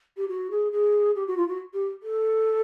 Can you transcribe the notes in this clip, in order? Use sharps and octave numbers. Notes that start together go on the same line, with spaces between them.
G4
F#4
G#4
G#4
G4
F#4
F4
F#4
G4
A4